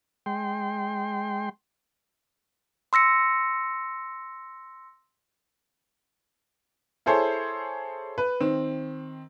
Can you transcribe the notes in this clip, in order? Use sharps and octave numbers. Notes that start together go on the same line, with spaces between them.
G#3 G5 C6
C6 E6 A#6 C#7
E4 G#4 A4 C5 C#5
B4
D#3 C4